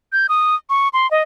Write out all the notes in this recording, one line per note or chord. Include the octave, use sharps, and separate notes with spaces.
G6
D#6
C#6
C6
D#5